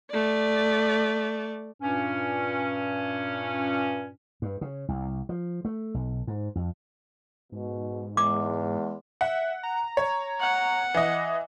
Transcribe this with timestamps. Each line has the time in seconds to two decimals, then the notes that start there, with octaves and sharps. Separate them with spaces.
0.11 A3 D5
1.82 G2 A#2 C#4
4.42 G2
4.61 C#3
4.89 C2
5.29 F3
5.65 A3
5.94 B1
6.27 G#2
6.55 F2
7.52 G#2 B2
8.17 E2 G#3 D6
9.21 E5 F#5
9.63 A#5
9.97 C#5
10.41 F#5
10.94 E3 D#5